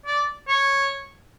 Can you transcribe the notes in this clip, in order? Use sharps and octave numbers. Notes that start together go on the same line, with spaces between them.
D5
C#5